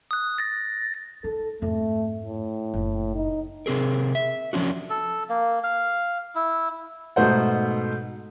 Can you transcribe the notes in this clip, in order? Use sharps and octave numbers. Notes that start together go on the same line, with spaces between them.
D#6 F#6
A6 A#6
D#4 A4
F2 G#2 A3
A2
F#1 A#2
D#4
C3 C4 G#4 A#4
E5
F3 C#4 D4 F#4
A4
A#3
F5
E4
G#2 B2 A3 C5 F#5